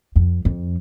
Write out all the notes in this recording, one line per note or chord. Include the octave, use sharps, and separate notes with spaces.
F2
F2